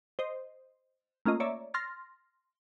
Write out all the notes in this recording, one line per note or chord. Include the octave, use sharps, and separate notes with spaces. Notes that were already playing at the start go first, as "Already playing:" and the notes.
C5 D#5
A3 A#3 C#4 F4 D#5
C#5 D5 E5 A#5
C6 F6 A6 A#6